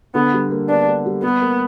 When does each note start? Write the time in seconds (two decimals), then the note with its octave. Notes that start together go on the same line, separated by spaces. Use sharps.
0.14 D3 B3
0.33 G3
0.51 A#3
0.69 B3 D4
0.88 A#3
1.06 G3
1.23 G3 B3
1.42 A#3